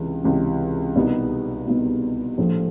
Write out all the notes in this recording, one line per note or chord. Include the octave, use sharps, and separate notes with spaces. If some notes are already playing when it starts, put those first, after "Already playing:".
Already playing: C#2 C3 E3
C#2 C3 E3
C2 B2 G3 B3 D#4
C2 B2 G3 B3 D#4
A#1 A2 F3 A3